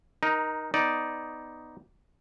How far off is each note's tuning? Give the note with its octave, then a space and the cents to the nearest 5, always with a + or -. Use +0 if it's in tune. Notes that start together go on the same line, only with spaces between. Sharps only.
D#4 +0 A#4 +25
B3 +15 D#4 +5 D5 +0